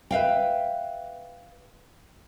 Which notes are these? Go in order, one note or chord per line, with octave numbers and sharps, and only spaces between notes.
B4 E5 F5 G5